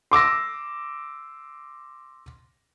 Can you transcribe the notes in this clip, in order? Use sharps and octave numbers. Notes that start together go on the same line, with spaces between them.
C6 D6 E6 A#6